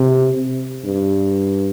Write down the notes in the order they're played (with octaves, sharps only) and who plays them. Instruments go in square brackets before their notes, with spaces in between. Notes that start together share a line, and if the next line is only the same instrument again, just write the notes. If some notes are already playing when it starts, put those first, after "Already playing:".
Already playing: [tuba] C3
G2